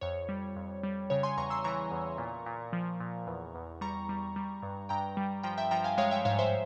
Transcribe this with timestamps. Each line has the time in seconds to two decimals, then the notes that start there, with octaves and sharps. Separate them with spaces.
0.01 F2 C#5
0.29 G3
0.56 F2
0.83 G3
1.10 C#3 C#5
1.23 G#5 C6
1.37 E2 A#5 C#6
1.50 C6 E6
1.64 E3 A#5 C#6
1.92 E2
2.18 A#2
2.46 A#2
2.73 F3
3.00 A#2
3.27 E2
3.55 E2
3.81 G3 A#5 C#6
4.09 G3
4.36 G3
4.62 G2
4.89 G2 G5 A#5
5.17 G3
5.43 F3 G5 A#5
5.58 E5 G5
5.71 F3 G5 A#5
5.84 F5 G#5
5.98 G#3 C#5 F5
6.11 E5 G5
6.25 G#2 C#5 F5
6.39 C5 E5